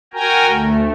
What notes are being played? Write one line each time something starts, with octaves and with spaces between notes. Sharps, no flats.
F#4 A#4 G5 G#5 A#5
D2 A3